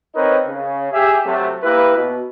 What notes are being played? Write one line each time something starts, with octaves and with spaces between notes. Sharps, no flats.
C4 D#4 A#4 B4 C#5 D#5
C#3
G4 G#4 E5
C3 F#3 A3
A#3 E4 G4 B4
B2